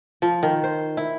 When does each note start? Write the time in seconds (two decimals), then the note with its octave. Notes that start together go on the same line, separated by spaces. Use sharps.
0.22 F3
0.43 D#3
0.64 C5
0.97 E4